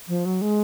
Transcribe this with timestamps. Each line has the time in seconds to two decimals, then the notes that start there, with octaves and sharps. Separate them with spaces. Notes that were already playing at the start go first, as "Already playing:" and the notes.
0.08 F3
0.26 F#3
0.42 G#3